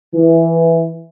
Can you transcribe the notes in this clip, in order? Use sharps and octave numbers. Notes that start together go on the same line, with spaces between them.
E3